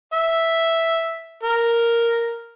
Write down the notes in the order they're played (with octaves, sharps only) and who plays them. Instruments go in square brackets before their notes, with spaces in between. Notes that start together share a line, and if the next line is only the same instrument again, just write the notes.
[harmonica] E5
A#4